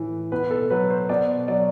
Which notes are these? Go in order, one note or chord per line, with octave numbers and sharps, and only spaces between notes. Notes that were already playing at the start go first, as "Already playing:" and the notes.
Already playing: A2 E3
B2 B4
A4
F#3 B4
C5
B2 D5
F#3 D5